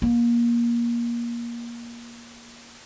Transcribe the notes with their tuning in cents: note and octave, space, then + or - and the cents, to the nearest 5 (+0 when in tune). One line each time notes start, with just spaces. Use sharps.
A#3 +20